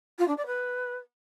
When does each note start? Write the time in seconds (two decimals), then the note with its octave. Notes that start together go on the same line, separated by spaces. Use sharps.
0.19 F4
0.28 D4
0.37 D5
0.47 B4